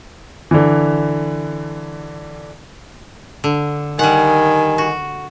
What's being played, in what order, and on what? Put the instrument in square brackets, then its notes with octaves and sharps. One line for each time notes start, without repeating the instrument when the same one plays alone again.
[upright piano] D3 E3
[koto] D3
[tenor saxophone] D#3 [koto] G3 F#5 [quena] G#5
[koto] F#4